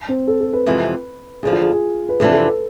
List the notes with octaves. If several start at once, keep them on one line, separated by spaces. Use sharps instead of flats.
C4
A4
A4
B4
F2 C3 E3 G#3 B3
E2 D3 F3 G#4
F4
G#4
G#4
B4
F2 C3 E3 B3 D4 A4
A4
B4